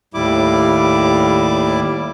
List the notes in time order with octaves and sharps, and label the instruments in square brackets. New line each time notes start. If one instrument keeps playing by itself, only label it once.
[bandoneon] D#2 A2 G3 E4 D6